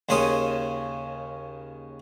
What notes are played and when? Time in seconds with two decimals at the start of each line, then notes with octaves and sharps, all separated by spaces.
0.09 D#2 C#3 C#4 C6 D#6